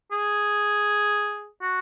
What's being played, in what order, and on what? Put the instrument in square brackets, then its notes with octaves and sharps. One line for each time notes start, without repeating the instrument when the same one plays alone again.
[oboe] G#4
F#4